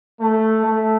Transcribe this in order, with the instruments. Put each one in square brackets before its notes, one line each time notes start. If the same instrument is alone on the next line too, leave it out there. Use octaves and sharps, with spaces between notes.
[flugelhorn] A3
A3